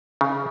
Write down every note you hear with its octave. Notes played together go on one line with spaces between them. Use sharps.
C#3